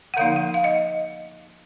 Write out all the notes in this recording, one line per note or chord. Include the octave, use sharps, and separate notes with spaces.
F#5
D3 F3 A#3 D#4 F5
F#5
F5
D#5